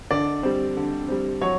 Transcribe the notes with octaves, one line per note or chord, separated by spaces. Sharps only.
D3 D5
G3 C4
D3
G3 C4
F#3 C#5